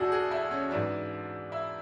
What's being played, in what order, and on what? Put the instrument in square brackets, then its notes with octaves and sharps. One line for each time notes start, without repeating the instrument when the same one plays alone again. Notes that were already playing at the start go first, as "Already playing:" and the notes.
Already playing: [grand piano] E2 B2 D4 E4 F#4 G#4 A4
G#4
E4
C#4
G#2 E3 D4
E4